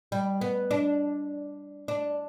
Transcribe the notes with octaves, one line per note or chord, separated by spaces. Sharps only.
G3
B3
D4
D4